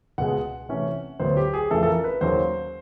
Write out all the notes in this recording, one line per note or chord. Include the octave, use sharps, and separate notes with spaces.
C#2 B2 G#3 F#5
C3 E3 A3 C#4
D2 D3 F#3 B3 C5
G4
G#4
F2 C#3 E3 A3 A4
A4
A#4
B4
D#2 C#3 F#3 A#3 C5